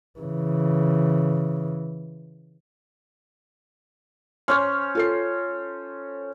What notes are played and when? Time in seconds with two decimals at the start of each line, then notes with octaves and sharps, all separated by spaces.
0.20 C#3 E3
4.48 C#4 C5 C#5 C6 F6
4.95 F4 A4 C7